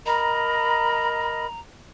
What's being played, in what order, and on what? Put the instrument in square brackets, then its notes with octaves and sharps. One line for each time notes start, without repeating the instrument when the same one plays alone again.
[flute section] A#4 D#5 B5 [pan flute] A#5